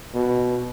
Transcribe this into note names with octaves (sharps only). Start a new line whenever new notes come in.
B2